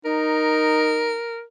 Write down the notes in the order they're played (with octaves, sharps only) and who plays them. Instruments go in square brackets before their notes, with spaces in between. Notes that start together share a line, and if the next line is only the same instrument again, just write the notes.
[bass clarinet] D#4 [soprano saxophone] A#4